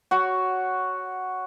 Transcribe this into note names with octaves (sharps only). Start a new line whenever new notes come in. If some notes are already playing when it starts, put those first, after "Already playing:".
F#4 C#5